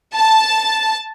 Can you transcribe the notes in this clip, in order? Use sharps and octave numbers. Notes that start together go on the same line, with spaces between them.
A5